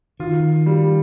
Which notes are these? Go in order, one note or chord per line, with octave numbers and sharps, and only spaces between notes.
D#3 F4
G3